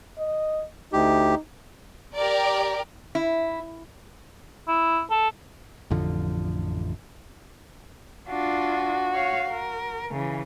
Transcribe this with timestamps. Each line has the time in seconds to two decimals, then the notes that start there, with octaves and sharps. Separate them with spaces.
0.18 D#5
0.93 D2 D#4 G4
2.15 G4 A#4 D5
3.15 E4
4.68 E4
5.10 A4
5.91 A1 F2 D3 F3
8.29 D4 F4 F#4
9.13 C#5 F5
9.50 A#4
10.11 C#3 E3